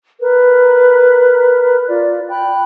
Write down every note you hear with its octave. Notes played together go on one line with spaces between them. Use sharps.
A#4 B4
F4 D5
G5 B5 F#6